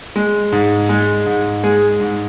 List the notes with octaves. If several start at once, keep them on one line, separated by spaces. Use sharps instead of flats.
G#3
G#2
G#3
G#2
G#3 G#4
G#2